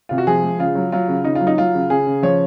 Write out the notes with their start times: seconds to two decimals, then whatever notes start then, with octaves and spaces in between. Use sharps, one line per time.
0.09 C3 F4
0.18 F#4
0.27 F3 G#4
0.43 G#3
0.59 C#3 F4
0.75 F#3
0.92 F#3 F4
1.08 C#3
1.24 C#3 D#4
1.35 F4
1.41 F#3
1.47 D#4
1.58 F#3 F4
1.75 C#3
1.90 C#3 G#4
2.07 C#3
2.23 F3 C#5